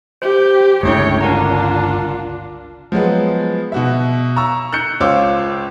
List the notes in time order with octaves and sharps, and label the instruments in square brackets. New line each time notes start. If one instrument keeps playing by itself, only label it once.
[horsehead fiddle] G4 [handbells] C5
[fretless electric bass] G1 C#2 C#3 [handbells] A3 D4 E4 [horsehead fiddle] C#5 G5
[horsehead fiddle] D4 F4 [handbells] A#4 F#5 A#5
[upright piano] F3 F#3 G#3 B3
B2 F#4 E5
A#5 C#6 E6
F#6 G6 C#7
C#2 F4 C5 C#5 D6 E6